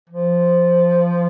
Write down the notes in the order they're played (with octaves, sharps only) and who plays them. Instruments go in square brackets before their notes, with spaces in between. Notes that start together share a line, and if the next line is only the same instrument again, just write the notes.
[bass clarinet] F3